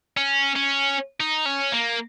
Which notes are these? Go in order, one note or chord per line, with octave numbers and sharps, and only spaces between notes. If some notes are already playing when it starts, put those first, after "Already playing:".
C#4
C#4
D#4
C#4
A#3